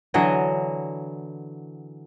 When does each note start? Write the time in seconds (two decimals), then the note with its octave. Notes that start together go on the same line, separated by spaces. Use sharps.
0.14 D3 E3 F#3 D#5